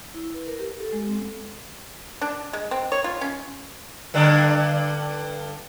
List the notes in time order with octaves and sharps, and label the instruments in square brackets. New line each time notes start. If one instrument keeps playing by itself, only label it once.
[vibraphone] E4
B4
A#4
G4
A4
G#3
C4
[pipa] D4
G#3
C4
C#5
F4
C#4
[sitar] G2 D3 D4